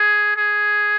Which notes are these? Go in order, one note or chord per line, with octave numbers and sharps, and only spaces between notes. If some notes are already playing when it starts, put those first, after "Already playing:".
Already playing: G#4
G#4